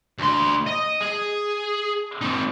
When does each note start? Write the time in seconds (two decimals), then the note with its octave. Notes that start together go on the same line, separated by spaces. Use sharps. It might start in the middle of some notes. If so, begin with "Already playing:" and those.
0.19 D2 C6
0.67 D#5
1.01 G#4
2.21 C4 D#4